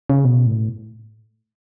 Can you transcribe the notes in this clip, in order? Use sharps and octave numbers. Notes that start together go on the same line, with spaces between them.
C#3
B2
A2